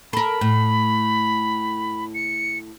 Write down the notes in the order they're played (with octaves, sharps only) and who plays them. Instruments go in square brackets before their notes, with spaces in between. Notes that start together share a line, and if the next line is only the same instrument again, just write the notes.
[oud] A4 A#4 [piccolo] B5
[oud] A2
[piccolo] C#7